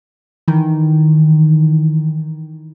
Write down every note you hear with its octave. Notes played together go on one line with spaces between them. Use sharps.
D#3 E3